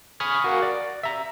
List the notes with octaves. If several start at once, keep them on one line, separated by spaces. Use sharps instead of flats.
G#5 B5 C#6 D#6 F6 G#6
F#4 A#4 F5 F#5
D5
E5 A#5